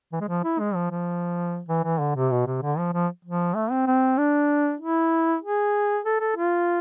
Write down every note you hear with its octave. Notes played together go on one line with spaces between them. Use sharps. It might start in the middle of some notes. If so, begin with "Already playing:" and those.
E3
G#3
F3
E4
G#3
F3
F3
E3
E3
D3
C3
B2
C3
D3
F3
F3
F3
A3
C4
C4
D4
E4
G#4
A4
A4
F4